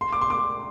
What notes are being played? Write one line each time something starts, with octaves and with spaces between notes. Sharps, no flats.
C6
D6
C6
D6